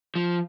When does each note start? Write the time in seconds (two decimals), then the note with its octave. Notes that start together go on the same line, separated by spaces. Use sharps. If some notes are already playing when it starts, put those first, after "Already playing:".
0.16 F3